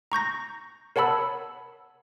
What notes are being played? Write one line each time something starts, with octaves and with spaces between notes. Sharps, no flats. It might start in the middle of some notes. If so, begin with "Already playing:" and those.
A#5 C#6 G6 A#6
A#4 C#5 F#5 A5 B5 E6